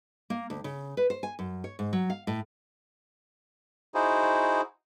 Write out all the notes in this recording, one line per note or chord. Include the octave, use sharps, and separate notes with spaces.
A#3
D2
C#3
B4
C5
G#5
F#2
C#5
G#2
F#3
F5
A2
D#4 E4 F#4 G#4 C5